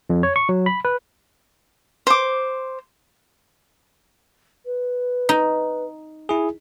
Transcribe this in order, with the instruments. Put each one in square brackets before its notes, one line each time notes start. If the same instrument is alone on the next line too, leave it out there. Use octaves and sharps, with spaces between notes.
[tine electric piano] F2
C#5
C#6
F#3
B5
B4
[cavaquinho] C5 D6
[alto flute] B4
[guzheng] D#4
[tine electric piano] E4 G#4